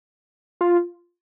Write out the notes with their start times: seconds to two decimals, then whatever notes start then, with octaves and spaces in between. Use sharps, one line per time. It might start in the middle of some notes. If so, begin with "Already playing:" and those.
0.61 F4